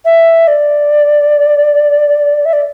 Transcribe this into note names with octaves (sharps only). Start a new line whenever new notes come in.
E5
D5
E5
D5